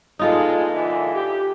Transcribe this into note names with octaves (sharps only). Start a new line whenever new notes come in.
G2 A#2 G#3 D#4 F4 A4
A#2 D3 E3
G4